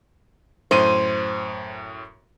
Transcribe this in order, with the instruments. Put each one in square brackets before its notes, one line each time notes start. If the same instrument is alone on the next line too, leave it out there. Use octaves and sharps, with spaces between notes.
[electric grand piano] F#2 A2 D#7 [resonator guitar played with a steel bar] C5